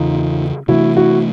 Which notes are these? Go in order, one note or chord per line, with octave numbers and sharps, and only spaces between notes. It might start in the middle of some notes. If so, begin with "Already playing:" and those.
Already playing: E2 C#3 E3 D#4 F4
C3 E3 A3 D4 E4 F#4
E4 F#4